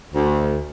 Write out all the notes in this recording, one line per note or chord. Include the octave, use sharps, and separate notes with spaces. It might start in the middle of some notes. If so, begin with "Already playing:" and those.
D2